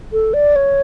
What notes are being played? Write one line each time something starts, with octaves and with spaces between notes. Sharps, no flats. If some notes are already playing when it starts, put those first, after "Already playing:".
A4
D5
C#5